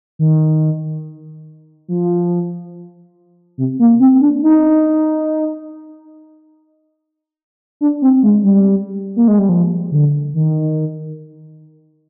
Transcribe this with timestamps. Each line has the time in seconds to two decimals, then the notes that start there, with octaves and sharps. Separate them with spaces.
0.19 D#3
1.88 F3
3.58 C3
3.79 A#3
4.00 C4
4.21 D4
4.43 D#4
7.81 D4
8.02 C4
8.23 G#3
8.43 G3
9.16 A#3
9.28 G#3
9.38 G3
9.49 F3
9.92 D3
10.34 D#3